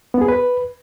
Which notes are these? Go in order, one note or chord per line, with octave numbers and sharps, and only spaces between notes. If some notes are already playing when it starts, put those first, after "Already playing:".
B3
G#4
B4